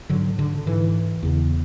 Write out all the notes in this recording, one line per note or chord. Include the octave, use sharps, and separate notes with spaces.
G#2 D3 F#3
D3
G#2 E3
E2 C#3